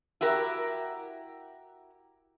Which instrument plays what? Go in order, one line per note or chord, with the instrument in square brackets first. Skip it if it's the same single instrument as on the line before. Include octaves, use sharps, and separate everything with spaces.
[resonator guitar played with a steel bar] E4 F#4 G4 A#4